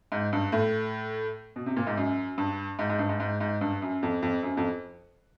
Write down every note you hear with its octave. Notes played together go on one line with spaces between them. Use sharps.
G#2
G2
A2
B2
C3
A#2
G#2
F#2
G2
G#2
G#2
G2
G#2
G#2
G#2
G2
F#2
F2
F2
F#2
F2